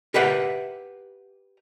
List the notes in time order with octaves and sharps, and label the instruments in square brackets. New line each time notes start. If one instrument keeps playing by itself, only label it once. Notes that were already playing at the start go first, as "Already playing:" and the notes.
[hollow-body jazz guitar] G4 A#4 B4 E5 F#5